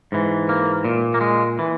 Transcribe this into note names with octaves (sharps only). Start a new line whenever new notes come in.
G#2 E3
A#3
A#2
A#3
G#3
E3